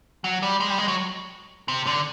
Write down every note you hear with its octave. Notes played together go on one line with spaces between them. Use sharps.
F#3
G3
G#3
G3
G#3
F#3
C3
D3